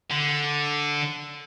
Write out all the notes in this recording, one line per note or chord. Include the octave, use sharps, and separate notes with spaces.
D3